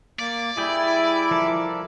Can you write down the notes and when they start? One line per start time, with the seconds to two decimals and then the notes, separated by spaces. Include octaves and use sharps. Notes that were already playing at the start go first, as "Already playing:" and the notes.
0.19 A#3 D5
0.57 G3 E4 G#4 E5 G5 D6
1.31 F3 A4 A#4